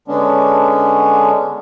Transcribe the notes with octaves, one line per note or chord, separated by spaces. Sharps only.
D3 G#3 B3 C#4 D4